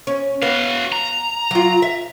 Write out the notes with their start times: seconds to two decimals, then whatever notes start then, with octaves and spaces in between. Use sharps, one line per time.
0.07 C#4
0.42 B3 F#4 F5
0.92 A#5
1.51 F#3 F4
1.82 E5